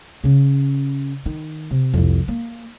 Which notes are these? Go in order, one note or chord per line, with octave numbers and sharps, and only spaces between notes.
C#3 C#4
D#3
C3
C2 F2
A#3